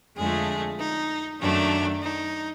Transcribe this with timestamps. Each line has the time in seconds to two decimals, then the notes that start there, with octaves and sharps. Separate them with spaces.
0.17 F2 D3 F3 G#3 A3 G#4
0.79 D#4
1.40 F#2 D#3 F#3 A3 D4
2.03 D#4